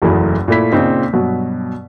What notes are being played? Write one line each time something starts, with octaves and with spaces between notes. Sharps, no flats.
F#1 B1 E2 A3 E4 G#4
A#2 A3 E4 B6
A#2 C#3 C4 D#4
G2 B2 F#3